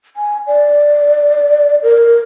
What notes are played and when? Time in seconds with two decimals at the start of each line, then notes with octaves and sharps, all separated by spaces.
0.16 G#5
0.47 D5
1.83 A#4